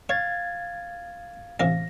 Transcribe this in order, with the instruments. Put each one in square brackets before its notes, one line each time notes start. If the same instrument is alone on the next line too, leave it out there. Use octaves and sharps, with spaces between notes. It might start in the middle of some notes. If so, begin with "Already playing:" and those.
[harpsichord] C#5 [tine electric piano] F5 G#6 A6
[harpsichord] A1 C3 F5 [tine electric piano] A#6